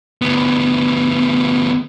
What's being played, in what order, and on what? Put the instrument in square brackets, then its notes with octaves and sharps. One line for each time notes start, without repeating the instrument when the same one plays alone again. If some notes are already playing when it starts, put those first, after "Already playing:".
[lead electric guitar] D2 B3